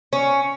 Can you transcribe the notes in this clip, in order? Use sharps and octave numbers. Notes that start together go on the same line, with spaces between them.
C#4